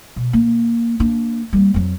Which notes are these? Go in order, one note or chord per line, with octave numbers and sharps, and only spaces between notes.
B2
A#3
A#3 D4
G3 A#3
F2 F#3